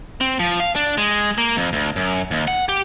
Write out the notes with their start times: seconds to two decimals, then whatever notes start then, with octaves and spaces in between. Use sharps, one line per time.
0.21 C4
0.39 F3
0.60 F5
0.76 D4
0.98 G#3
1.38 A#3
1.57 F2
1.73 D2
1.96 F#2
2.31 D#2
2.48 F#5
2.69 G4